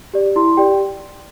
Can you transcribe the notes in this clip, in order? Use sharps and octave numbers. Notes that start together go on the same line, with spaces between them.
G4 D5
E4 C6
G4 D5 G5